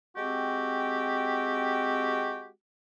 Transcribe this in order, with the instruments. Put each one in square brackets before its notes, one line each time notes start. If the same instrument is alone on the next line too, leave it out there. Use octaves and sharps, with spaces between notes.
[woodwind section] G#3 C4 F#4 G4